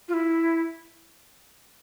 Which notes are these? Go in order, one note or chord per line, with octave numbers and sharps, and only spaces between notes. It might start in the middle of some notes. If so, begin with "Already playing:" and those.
F4
E4